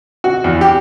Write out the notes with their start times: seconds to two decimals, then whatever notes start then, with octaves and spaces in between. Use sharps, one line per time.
0.24 F#4
0.44 E2
0.61 G4